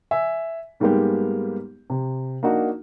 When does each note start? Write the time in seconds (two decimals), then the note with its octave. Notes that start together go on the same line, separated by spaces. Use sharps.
0.11 E5 G#5
0.80 G#2 G3 G#3 A#3 B3 G4
1.90 C3
2.43 A#3 D4 D#4 F#4